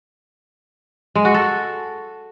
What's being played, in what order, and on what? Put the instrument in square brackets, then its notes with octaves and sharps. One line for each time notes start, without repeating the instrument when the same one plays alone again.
[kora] G#3
F#4
A4